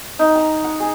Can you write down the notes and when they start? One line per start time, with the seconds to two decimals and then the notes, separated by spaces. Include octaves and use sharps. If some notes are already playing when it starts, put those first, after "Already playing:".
0.19 D#4
0.35 A#5
0.64 F#5
0.80 G#4